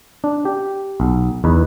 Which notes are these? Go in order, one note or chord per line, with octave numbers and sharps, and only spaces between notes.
D4
G4
B1
E2 D#4 B4